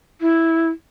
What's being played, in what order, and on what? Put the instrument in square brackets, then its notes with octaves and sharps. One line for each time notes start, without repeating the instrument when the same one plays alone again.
[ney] E4